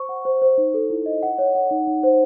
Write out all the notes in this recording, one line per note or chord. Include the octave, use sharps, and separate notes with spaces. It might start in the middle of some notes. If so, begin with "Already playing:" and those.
Already playing: C5 C#6
F#5
C5
C5
D#4
A4
E4
D#5
F#5
C#5
F#5
D#4
D#4
C5